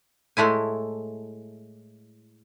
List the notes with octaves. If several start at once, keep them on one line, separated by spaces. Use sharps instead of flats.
A2 G#3 A3 E4 G#5